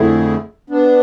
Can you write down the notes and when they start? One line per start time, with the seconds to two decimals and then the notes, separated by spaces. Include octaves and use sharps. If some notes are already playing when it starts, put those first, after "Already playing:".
Already playing: F2 D3 A3 E4 G#4
0.70 B3 D4